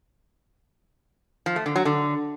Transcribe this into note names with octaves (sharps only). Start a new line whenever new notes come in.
F3
A3
D3
F#3
D3